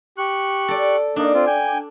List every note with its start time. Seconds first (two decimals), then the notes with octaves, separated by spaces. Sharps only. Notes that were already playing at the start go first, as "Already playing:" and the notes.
0.18 G4 C#6 F#6
0.68 A4 D5
1.16 A#3 D4 D#4
1.34 C4 F4
1.47 G5 G#5